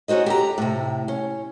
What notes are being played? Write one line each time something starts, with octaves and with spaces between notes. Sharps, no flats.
C#4 D#4 F#4 C5 D#5
G4 A4 A#5
A2 C3
C#4